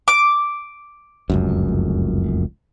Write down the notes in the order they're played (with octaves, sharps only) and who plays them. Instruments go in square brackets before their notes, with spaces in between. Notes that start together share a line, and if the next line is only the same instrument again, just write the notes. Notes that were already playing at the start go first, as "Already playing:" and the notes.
[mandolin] D6
[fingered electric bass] F1 C#2 F#2